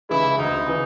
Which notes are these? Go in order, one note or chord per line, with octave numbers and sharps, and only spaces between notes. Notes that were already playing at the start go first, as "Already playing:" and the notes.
C#3 E3 G#3 E4
D2 D#4
C#3 E3